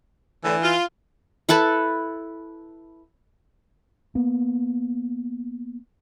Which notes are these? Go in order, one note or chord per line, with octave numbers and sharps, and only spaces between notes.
A2 D3 E3
F4
E4 A4 B4 A5
A#3 B3